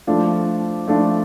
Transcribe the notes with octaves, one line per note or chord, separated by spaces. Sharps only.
F3 A3 D4 F4
F3 A3 D4 F4